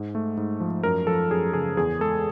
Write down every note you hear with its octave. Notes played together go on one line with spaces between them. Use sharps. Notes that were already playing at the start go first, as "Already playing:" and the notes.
Already playing: G#2
A3
G#2
F3
F#2 A#4
F3 A4
F#2 G#4
C#3 G#4
E2 G#4
G#3 A4